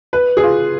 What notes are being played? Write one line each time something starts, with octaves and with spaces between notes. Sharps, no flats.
B4
G#4
F4